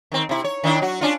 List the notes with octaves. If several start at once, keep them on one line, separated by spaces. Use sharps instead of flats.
D#3 C4
C3 E4
C#5
D#3 D4 E4
F#3 F#4
C#4 D4 F4